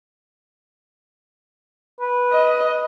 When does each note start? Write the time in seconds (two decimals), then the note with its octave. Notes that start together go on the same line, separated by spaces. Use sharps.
2.01 B4
2.33 D#5